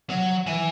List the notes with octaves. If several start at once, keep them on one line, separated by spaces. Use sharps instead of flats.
F#3
E3